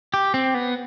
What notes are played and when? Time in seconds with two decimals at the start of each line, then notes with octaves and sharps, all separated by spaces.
0.14 G4
0.34 C4
0.54 B3